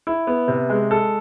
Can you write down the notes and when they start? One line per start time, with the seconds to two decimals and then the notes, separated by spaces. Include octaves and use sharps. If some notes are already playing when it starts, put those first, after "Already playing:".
0.07 E4
0.27 B3
0.48 C3
0.70 G#3
0.91 A4